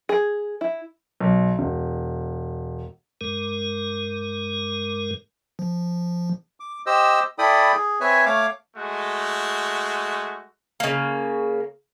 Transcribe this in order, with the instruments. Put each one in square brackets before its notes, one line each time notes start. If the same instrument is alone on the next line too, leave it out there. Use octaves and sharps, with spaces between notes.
[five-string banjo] G#4
E4
[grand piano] B1
E1
[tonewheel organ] G2 G#3 A#4
[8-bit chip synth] F3
[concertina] D6
G4 C5 D#5 E6
E4 A4 D5 G5 B5 D#6
G#4
C4 B4 C#5 E5 G#5
A3 C#5 F5 D6
[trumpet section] G#3 A3 F#4
[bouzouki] C#3 A#3